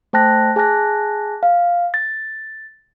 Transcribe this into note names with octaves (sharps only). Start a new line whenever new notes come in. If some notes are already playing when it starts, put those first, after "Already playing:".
A3 C5 G5 A5 F#6 A#6
G#4 G#5 A5 F#6 A#6
F5
A6